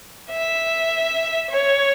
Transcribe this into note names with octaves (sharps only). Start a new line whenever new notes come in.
E5
C#5